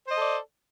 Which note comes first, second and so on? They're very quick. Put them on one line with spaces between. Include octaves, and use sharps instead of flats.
C5 D#5 A4 D5